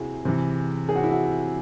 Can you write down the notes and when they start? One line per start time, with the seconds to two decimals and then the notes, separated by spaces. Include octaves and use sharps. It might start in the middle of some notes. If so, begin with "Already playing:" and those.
Already playing: C3 E4 F#4 G#4
0.25 C3 E3
0.89 G#4
0.95 F#4
1.03 E4
1.12 F#4